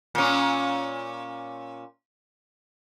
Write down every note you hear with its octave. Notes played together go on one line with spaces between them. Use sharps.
A#2 C#4